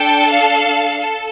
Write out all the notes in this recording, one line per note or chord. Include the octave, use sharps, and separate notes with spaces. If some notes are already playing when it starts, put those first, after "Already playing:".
Already playing: D4 A4 G5
F5
A4